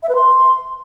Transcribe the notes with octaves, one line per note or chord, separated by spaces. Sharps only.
E5
B4
C6